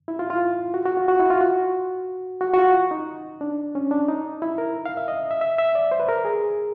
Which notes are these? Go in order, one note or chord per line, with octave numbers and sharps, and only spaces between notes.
E4
F4
F4
F#4
F#4
F4
F#4
E4
F4
F#4
F#4
F#4
F4
D#4
D4
C#4
D4
D#4
E4
A#4
F5
E5
D#5
E5
E5
E5
D5
C5
B4
A#4
G#4